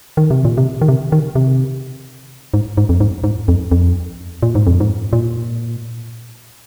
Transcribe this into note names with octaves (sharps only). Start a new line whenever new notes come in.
D#3
C3
A#2
C3
D#3
C3
D#3
C3
G#2
G#2
F2
G#2
G#2
F2
F2
A#2
G#2
F2
G#2
A#2